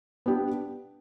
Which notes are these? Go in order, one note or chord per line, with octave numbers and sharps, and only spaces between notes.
B3 D4 G4